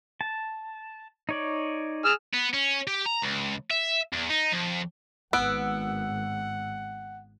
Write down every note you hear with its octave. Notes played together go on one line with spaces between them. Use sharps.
A5
D#4 C#5 D5
G#4 E6 F6
B3
C#4
G4
A#5
C#2
E5
E2
D#4
F2
G#1 B3 F#5 E6 F#6 D7